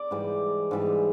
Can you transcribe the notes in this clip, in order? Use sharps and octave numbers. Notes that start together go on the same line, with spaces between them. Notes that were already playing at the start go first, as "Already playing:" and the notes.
Already playing: D5
G#2 E3 G3
G#2 E3 G3